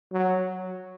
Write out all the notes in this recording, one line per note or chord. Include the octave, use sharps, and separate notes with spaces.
F#3